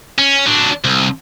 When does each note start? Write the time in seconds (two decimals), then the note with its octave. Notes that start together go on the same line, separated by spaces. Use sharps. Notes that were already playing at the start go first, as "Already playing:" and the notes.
0.19 C#4
0.46 F#3 D4
0.84 C2